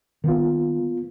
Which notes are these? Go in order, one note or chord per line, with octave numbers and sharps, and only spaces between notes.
D#3 G3 A#3 B3 F4